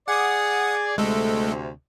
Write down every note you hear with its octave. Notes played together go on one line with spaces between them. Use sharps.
G#4 D5 F#5 D#6
D2 C3 G#3 A3 A4